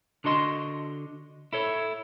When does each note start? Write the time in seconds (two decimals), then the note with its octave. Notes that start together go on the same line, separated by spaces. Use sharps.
0.24 D3 D4 F#4 D#5 C6
1.53 E4 A4 C#5